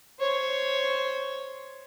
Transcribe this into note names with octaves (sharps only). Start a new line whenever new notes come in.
C5 C#5